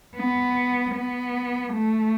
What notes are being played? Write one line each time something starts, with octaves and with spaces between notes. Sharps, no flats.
B3
B3
A3